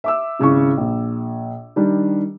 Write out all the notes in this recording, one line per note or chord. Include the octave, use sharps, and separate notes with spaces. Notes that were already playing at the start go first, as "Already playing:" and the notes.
E5 D6 E6
G#1 C#3 E4 C#6
A#1
D#3 G3 D4